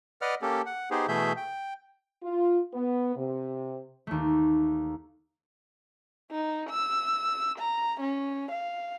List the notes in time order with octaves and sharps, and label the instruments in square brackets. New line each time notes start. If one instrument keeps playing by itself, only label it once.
[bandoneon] B4 D5 D#5 F#5 F6
A#3 C#4 G4 A4
F#5
B3 D#4 G4 G#4 C5
B2 E3 A3 G#4 E5 G6
G5
[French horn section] F4
B3
C3
[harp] D#2 A3
[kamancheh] D#4
E6
A#5
C#4
F5